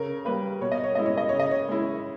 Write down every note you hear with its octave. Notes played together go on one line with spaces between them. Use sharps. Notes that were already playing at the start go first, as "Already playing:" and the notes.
Already playing: C#3 A#4
G3 A#3 B4
B2 C#5
D#5
C#5
G#3 C#4 E4 D#5
C#5
D#5
C#3 C#5
D#5
C#5
G#3 C#4 E4